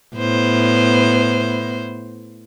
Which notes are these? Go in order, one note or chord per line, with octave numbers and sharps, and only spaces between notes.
A2 B3 C5